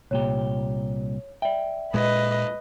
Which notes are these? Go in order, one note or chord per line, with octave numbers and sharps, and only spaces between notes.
C2 A#2 G4 C#5
D5 E5 G5
A#2 G#3 B4 D#5